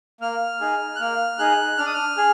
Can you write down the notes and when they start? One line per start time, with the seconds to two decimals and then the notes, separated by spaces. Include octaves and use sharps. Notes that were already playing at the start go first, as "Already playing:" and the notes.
0.21 A#3 F6
0.61 D#4 G#4
0.96 F#6
1.00 A#3 F6
1.38 D#4 G#4 F#6
1.78 D4 F6
1.86 D#6
1.94 F6
2.18 G#4